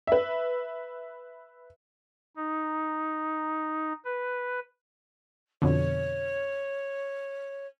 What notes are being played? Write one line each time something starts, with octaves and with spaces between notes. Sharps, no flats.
B4 E5
D#4
B4
F2 B2 D3 C#5